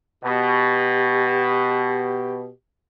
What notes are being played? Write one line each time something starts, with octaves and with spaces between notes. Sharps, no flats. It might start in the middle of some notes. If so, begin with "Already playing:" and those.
B2 G4